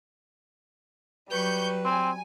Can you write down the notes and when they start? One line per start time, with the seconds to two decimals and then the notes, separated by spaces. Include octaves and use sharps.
1.31 F#3 G3 B4 C#6 G6
1.84 C4 G#5